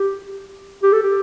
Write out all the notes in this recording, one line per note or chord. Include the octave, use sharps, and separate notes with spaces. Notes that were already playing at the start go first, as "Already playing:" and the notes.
Already playing: G4
G4
A4
G4